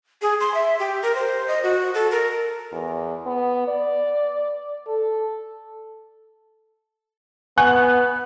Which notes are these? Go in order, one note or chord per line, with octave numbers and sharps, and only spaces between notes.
G#4
C6
E5
G4
A#4
C5
D#5
F#4
A4
A#4
E2
B3
D5
A4
B3 F#5 G#5 C#6 F#6